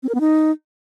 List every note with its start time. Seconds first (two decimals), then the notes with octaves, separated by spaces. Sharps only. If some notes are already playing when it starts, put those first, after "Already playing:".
0.03 C4
0.09 A#4
0.15 B3
0.20 D#4